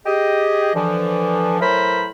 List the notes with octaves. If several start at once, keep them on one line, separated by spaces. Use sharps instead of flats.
G4 G#4 D#5
D3 E3 F3
A2 E3 F#3 A#4 C5 B5